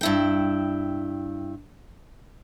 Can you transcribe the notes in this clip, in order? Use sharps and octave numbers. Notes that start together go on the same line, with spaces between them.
G2 E4 G5